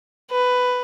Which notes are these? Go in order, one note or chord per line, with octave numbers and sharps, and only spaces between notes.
B4